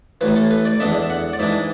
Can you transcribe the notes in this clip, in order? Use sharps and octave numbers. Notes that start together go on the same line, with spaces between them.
A1 A2 E3 B4
A4
B4
D5
E2 D3 G#3 D4 E5
E5
F#5
D5
G#2 E3 G#3 D4 E5